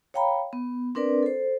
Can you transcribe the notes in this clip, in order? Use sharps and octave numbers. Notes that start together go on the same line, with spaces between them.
C#5 F5 G5 A#5 B5
B3
C4 D4 A#4 B4 D5
A4 C5